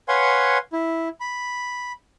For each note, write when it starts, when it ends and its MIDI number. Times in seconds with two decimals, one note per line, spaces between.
0.08 0.58 71
0.08 0.58 73
0.08 0.58 77
0.08 0.58 78
0.08 0.58 80
0.08 0.58 84
0.73 1.08 64
1.20 1.92 83